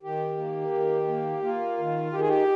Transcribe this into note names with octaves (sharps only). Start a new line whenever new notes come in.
D#3 G4
A#3
D#3
A#3
A#3 F4
D#3
D#3 G4
G#4
G4